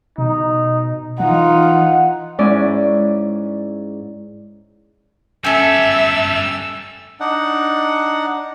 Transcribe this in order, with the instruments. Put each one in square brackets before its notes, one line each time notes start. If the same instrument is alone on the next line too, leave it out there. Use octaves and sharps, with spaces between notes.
[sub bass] B2 [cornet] D#4
[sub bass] E3 [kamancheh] D#4 F4 [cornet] F#5
[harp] G#2 G#3 C#4 E4 D5
[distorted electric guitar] G3 A4 [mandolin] A3 C#4 [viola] E5 [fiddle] E6
[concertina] D4 D#4 F#5